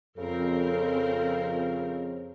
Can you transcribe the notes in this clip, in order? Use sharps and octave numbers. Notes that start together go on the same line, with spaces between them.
F2 C#3 C4 A4 A#4